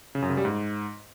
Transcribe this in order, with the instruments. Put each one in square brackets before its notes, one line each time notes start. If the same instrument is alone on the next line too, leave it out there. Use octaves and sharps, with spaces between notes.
[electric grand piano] C#3
F#2
C#3
G3
G#2